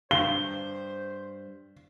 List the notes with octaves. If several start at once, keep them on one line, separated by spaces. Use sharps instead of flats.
G2 C5 G7